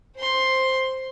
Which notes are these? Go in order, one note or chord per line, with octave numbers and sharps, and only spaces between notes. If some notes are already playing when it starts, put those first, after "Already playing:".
C5 C6